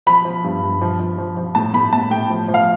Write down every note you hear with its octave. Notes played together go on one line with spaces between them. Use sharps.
F3 B5
F3
G2
G2
F3
F3
F3
F3
A2 A5
A2 B5
A2 A5
A2 G5
F3
F3
F5